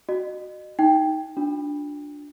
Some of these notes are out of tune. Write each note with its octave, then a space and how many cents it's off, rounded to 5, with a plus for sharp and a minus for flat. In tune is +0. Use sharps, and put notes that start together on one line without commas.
F#4 +0 D#5 -35
D#4 +10 G5 +0
D4 +0 F4 +45